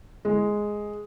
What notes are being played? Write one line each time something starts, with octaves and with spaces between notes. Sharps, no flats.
G#3